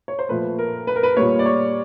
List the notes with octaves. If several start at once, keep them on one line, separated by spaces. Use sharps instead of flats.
C#5
C5
A#2 F3 A3 B4
A#4
B4
A#4
B4
A#2 G3 A#3 C#5
D5
C#5